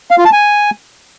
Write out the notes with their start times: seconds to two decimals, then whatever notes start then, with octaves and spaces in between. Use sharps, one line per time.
0.11 F5
0.18 F4
0.25 A5
0.32 G#5